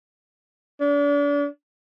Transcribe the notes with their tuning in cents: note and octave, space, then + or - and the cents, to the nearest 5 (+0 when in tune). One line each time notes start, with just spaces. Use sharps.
D4 -35